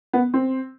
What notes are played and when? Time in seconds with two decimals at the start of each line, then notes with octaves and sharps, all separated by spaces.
0.13 B3
0.34 C4